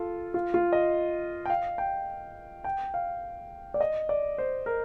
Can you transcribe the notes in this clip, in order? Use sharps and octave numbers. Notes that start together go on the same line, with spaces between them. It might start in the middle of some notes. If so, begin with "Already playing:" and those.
Already playing: F4 A4
F4
F4
D#5
G5
F5
G5
G5
F5
D5
D#5
D5
C5
A#4